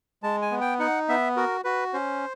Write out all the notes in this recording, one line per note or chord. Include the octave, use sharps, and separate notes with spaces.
G#3 A5
G#5
B3
G5
D#4 F#5
B3 E5
F#4 A#4
F#4 B4
C#4 C5